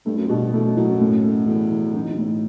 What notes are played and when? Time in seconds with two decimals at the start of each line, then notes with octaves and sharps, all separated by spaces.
0.06 G2 A3
0.16 F#2
0.28 G2 B2
0.53 E2 A3
0.65 F#2
0.77 A2 F#3
0.89 F#2
1.00 A2
1.24 A3
1.47 E2 A3
1.71 E3
1.94 F#2 D#4
2.07 E2
2.14 F#2
2.18 E2 A2